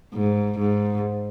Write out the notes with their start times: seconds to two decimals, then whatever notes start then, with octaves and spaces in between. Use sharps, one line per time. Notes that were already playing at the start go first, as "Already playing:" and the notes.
0.14 G#2
0.59 G#2